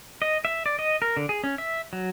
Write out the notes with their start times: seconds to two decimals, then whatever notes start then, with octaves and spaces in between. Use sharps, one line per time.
0.22 D#5
0.45 E5
0.66 D5
0.79 D#5
1.02 A#4
1.17 D3
1.29 G#4
1.44 C#4
1.58 E5
1.93 F#3